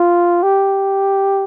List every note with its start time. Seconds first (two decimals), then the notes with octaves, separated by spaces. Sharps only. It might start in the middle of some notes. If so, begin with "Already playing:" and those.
Already playing: F4
0.43 G4